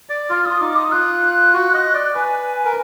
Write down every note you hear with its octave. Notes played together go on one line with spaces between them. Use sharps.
D5
F4 F6
F4 D#6
D#4 D6
D#6
F4 F#6
F#4
D#5
D5
B4 G#5
A#4